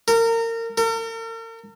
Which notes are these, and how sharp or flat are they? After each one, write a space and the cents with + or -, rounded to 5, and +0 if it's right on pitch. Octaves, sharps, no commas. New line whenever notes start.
A#4 -30
A#4 -45